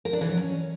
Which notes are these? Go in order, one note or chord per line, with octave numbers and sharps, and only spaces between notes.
A#4
D4
E3
F#3
C#4